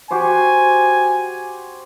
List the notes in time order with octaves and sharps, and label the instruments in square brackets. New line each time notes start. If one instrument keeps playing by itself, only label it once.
[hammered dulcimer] F#4 G4 C5 [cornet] G#5